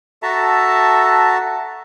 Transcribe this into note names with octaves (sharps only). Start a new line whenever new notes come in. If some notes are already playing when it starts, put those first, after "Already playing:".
F#4 A4 E5 A5 A#5